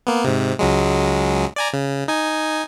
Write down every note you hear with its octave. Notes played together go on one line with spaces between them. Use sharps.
A#3 B3
G#2 C3
C#2 F#3 G#3
D5 G#5 A#5
C#3
D#4 G#5